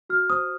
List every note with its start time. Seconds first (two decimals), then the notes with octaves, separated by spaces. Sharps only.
0.10 F#4 F6
0.30 C5 D#6